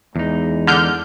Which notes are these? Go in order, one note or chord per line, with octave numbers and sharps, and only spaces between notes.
E2 G#3 D#4
D3 F6 G6